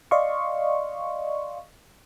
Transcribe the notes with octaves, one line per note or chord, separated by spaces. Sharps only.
D5 D#5 F5 C6 C#6